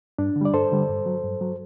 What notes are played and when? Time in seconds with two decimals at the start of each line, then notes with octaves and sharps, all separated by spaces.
0.18 G2 D4
0.36 D3
0.41 G3 D5
0.53 G2 A4 C5
0.72 D3 G3
0.89 G2
1.06 F#3
1.24 G2
1.41 F#3